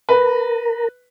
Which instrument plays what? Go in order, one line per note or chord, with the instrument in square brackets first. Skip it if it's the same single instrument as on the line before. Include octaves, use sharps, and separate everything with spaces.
[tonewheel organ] A#4 [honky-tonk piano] B4